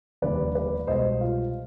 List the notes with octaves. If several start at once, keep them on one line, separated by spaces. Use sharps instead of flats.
F1 D#2 D3 G3 B4 D5
B4 D5
C2 B2 G#3 C5 D#5
F4